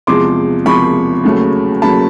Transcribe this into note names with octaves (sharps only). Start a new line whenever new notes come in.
E2 C3 F3 G#3 C6 D6
E2 C3 F3 G#3 B5 C#6
D#2 C#3 F#3 A3
D#2 C#3 F#3 A3 A5 B5